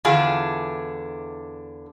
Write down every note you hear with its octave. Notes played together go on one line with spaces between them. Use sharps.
E2 D3 D4 F4 G#4